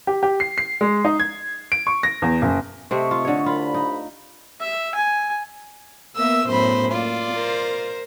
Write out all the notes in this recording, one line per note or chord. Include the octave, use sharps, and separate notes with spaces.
G4
G4
C7
C7
G#3
D#4
G#6
D7
C#6
A#6
E2
F#1
C3 A3 C4 D#5 C#6
F4
D3 C#5
C2 F4 B5
D#4
E5
G#5
A#3 B3 A#4 E5 E6
F#2 A2 B3 C5 B5
A#3 F4 D5
A#4 C5